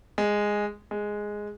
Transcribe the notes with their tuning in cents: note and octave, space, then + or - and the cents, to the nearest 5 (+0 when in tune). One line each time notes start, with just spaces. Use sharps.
G#3 -5
G#3 +0